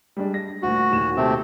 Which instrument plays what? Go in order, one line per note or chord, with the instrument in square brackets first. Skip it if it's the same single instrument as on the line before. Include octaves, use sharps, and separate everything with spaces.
[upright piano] G3 G#3 D4
A#6
[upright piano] D2 A#2 [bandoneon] F#4
[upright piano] D#2 A#2 E7
[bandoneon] C3 A3 C4